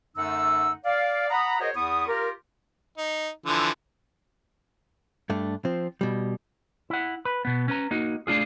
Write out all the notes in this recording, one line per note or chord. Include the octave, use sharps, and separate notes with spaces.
F#2 D3 A3 D#4 F#5 E6
D5 F5
F#5 A#5 B5 D#6
F#4 G#4 A#4 C5 C#5 D#5
E2 B3 E4 C#6 D#6
F4 G4 A#4
D#4
D3 E3 F3
G2 A3 D4
F3 C4
B2 G3
E4 F#5
B4
B2 B3
C#4 B4 A#5
A#3 D#4 F#4
A3 D4 F4 G#4